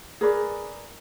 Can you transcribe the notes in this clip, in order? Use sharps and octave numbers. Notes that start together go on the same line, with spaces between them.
G#4 A#4 B4 D5